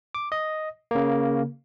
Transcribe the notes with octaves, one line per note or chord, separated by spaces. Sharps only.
D6
D#5
C#3 A#3